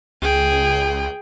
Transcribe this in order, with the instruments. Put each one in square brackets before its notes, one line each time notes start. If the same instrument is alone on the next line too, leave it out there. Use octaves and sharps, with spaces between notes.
[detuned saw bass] C#2 [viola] G#4 G5